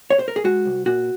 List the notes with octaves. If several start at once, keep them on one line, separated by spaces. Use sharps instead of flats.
C#5
C5
A#4
G#4
G#3 F#4
C2
A#2 F#4